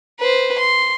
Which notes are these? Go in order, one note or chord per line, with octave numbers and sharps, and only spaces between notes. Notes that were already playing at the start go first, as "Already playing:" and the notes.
B4 C5
C6